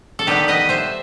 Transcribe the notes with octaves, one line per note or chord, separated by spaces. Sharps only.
A4
D#3 G3 B3 G4 B4
B4 D#5
C5 E5